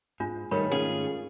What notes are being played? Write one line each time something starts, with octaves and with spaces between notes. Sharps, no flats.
G#2 D4 F4
G#2 D#3 G3 A3 D#4 A#4 C#5 B5
C#4 F4 G#4